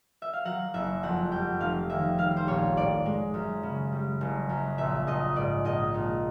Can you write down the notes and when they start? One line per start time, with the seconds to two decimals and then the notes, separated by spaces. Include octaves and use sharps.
0.22 E5
0.33 F5
0.45 F#3 F#5
0.74 F#1 E5
1.03 F2 F#5
1.31 G3 G5
1.60 F1 F5
1.89 D#2 E5
2.18 G3 F5
2.36 C5
2.47 A#1 C#5
2.76 A2 D5
3.05 G#3
3.34 F#2
3.63 C#3
3.92 G3
4.21 F#1
4.49 F#2
4.78 A#1 E5
5.07 A#1 D#5
5.36 G#2 D5
5.65 A#1 D#5
5.94 A#1